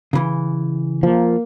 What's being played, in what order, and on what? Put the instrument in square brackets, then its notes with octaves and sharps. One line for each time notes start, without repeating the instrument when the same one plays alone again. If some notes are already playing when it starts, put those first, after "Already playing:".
[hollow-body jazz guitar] C#3 E3
[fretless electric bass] F3 [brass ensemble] A#3